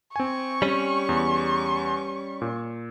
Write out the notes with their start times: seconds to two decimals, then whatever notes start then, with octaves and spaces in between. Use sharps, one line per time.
0.16 C4 G#5 C#6
0.62 G3 C#4
1.09 E2
2.41 A#2